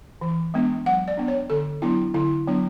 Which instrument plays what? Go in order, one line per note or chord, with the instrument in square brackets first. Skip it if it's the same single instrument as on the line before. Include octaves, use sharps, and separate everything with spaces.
[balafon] E3
G#3 B3 D4
F#3 F#5
D5
B3 D4
C#5
D3 A4
F#3 B3 D4 E4
D3 E4
F#3 B3 D4